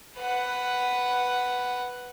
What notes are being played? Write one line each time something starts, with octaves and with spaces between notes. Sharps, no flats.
B4 F#5